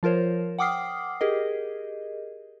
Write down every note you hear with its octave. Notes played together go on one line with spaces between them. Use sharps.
F3 F4 A#4 C5 C#5
F#5 G5 D6 D#6 F6 C7
G4 G#4 A#4 D#5